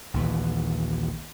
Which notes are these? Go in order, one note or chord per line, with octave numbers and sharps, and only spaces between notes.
A#1 D#2 E3